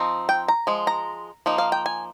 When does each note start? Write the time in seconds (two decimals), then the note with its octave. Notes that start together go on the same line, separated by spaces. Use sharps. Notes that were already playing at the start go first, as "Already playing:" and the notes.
Already playing: F3 C4 D#4
0.29 G5
0.48 A#5
0.67 F3 G#3
0.87 A#5
1.46 F3 A#3 D#4
1.58 F5
1.72 G5
1.86 G#5